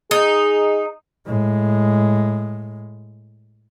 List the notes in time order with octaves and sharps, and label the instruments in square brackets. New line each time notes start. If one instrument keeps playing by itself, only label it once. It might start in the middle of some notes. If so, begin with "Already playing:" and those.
[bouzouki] D#4 [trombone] G#4
[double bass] A2 G#3